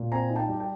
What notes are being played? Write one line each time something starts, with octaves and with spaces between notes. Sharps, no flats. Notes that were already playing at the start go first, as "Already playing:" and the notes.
Already playing: A#2
C4 G#5 A#5
D#4
G5 A5
G3
G5 A5